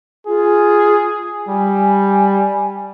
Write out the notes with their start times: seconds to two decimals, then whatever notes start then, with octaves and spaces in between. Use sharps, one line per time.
0.27 F4 G#4
1.49 G3 G#5